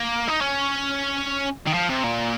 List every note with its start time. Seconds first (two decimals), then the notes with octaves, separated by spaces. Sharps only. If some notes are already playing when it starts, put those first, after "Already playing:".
Already playing: A#3
0.28 D#4
0.41 C#4
1.67 D#3
1.74 F3
1.89 C3
2.04 A#2